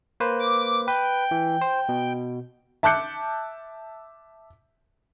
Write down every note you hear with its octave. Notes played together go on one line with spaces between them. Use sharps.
A#3 B4 C5
D6
B4 G5
E3
C5
B2
E5 A5 D6 F#6 G6 C#7